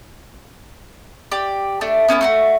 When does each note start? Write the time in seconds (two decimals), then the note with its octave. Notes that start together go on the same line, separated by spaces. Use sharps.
1.32 G4 D5
1.81 A3 D4
2.08 B3 C#4 D4 E4
2.21 A3 E4 F#4